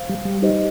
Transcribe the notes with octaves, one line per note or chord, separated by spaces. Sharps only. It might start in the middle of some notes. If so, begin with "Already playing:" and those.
Already playing: C5 F5
G3
G3
D#4 G4 C5 D#5